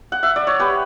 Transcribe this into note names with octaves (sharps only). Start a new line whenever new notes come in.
F#5
E5
D5
C#5
G4 B4